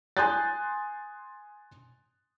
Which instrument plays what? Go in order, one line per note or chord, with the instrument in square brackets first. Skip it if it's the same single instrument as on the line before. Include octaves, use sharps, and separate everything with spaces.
[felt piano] G#5 C6 D#6 F#6 G6 A6